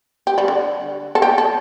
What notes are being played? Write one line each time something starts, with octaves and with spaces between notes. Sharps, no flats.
G4
G3
D3
A4
G4
A4